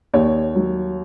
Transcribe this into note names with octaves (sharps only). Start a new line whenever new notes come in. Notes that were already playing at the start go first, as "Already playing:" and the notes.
D#2 C#5
F#3